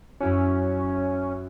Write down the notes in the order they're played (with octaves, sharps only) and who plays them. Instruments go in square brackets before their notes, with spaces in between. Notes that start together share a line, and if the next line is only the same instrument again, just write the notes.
[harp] F#2 E4 F#4 [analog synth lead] C#4